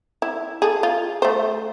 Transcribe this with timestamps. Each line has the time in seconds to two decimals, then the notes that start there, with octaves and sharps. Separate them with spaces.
0.22 E4
0.62 G#4 A4
0.83 F4
1.22 A3 C5